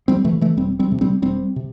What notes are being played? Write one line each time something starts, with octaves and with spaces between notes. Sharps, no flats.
G3 C4
C3 E3 A3
E3 A3
E1 G3 C4
G3 C4
D2 C3
G3 C4
E1 G3 C4
C3